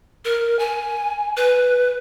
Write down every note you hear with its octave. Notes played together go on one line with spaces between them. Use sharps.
A#4
G#5
B4